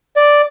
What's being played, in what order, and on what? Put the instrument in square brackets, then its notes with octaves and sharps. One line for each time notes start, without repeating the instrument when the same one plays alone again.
[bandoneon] D5